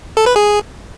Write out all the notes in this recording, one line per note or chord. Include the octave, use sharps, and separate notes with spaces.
A4
B4
G#4